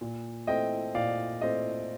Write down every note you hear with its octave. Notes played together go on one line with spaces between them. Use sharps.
A#2
A3 C4 D#5 G5
A#2 D5 F5
A3 C4 D#5